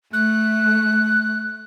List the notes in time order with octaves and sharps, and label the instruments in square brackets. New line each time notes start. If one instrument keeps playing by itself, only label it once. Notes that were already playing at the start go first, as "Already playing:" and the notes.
[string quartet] A3 [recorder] F#6